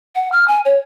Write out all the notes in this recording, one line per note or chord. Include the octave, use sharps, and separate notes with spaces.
F#5
F6
G#5
C#5